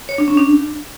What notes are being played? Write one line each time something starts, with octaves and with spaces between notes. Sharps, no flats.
C#5
D4
C#4
D4